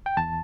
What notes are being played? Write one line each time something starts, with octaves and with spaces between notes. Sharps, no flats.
G5
E2 A5